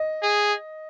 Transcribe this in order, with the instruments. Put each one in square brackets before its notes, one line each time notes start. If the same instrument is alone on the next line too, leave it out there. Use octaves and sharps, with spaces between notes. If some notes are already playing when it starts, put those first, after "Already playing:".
Already playing: [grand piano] D#5
[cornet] G#4